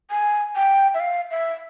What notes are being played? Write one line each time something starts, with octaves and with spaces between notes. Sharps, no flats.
G#5
G5
E5
F5
E5